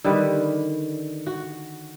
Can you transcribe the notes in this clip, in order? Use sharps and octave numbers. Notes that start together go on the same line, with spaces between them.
D3 D#3 G3 B4
F#4